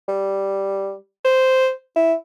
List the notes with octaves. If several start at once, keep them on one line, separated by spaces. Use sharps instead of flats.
G3
C5
E4